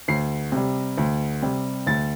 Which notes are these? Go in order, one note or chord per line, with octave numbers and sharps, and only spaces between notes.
D2 C7
C3 G3
D2
C3 G3
D2 A6